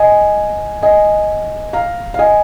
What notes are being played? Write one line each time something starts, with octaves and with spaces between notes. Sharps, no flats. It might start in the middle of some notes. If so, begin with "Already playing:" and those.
Already playing: D#5 G#5
D#5 G#5
F5 A#5
F5
D#5 G#5